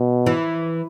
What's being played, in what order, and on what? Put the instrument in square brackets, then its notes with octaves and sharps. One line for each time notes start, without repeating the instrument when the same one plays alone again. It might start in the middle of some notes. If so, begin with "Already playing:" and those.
Already playing: [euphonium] B2
[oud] E3